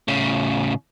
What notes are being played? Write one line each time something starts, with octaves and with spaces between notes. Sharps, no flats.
A2 C#3